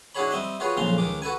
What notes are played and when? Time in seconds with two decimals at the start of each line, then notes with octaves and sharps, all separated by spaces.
0.15 D4 E4 F#4 G#4 C#5 B5
0.31 G3 C4 D#5 E5
0.60 F4 F#4 G#4 B4 C#5
0.77 B1 F2 A#2 C#3 A#5 C6
0.98 C#2 D#3 G#3 D6
1.22 F#4 A4 B4 G#5